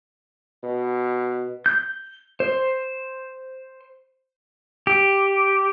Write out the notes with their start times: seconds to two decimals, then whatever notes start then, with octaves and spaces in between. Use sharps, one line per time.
0.63 B2
1.66 G6
2.40 C5
4.87 G4